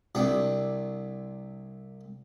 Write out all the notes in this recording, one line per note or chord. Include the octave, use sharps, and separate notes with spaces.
C2 C3 D4 D5